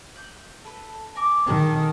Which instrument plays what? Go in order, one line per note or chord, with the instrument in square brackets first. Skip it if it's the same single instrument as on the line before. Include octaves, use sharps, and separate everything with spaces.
[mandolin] F#6 G6
A4 B4
G#5 A#5 D6
[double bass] D#3 [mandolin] G#4 A4 A5